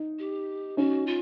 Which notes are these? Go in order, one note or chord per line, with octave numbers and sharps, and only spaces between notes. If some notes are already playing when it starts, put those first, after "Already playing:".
Already playing: D#4
G4
C#4 D#4 F#4
F4